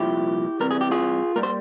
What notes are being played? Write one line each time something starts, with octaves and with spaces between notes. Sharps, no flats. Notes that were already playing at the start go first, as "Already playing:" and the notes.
Already playing: C2 A#2 F3 E4 G4
C2 C3 E3 G3 A#4
G#4
G4
F4 G#4
G3 A#3 A#4
C5